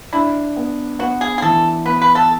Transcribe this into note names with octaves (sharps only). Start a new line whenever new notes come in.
D4 E4
B3
B3 F#4
G#4
G#4
E3 A4
B3 B4
B4
A4